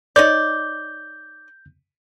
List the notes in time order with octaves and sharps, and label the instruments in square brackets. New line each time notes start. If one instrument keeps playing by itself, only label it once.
[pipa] D#4 C#5 D5 [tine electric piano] G6